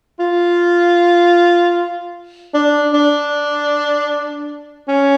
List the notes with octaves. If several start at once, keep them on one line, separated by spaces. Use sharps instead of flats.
F4
D4
D4
C#4